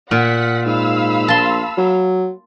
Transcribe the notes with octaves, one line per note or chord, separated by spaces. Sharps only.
A#2 F#5 B6
G#2 F5 B5 E6
A#1 A5 C6
F#3